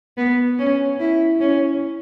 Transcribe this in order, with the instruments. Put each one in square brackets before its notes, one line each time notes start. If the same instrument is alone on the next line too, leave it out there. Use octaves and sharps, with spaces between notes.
[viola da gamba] B3
C#4
E4
C#4